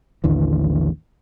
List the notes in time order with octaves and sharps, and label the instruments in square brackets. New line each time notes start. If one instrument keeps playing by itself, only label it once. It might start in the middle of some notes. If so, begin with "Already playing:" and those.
[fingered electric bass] A1 D#2 D3 E3